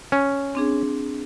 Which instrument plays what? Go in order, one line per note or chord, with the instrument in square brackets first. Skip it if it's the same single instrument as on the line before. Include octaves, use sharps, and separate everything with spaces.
[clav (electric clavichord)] C#4
[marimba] C4 D4 G#4